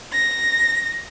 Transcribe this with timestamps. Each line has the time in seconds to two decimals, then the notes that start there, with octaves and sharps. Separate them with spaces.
0.13 A#6